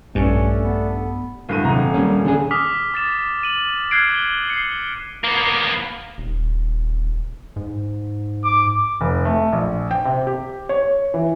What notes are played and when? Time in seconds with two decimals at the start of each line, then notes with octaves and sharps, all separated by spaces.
0.15 A#1 G2 A3 C#4 D4 A4
0.63 B3
1.49 D1 G2 D#7
1.64 D#1 C3 A#5
1.94 G3 A#3 C#4
2.25 D3 C#4 G#4
2.51 D6 D#6 F6 B6
2.94 D6 A6 B6 E7
3.43 D#7 F#7
3.91 F6 F#6 G#6 C7 D7
4.12 D7 G7
4.50 C7 C#7
5.24 A#3 B3
6.18 D#1
7.56 G#2
8.44 D6
9.01 F1
9.25 A3
9.53 A#1
9.91 G5
10.05 C3
10.27 G4
10.69 C#5
11.14 E3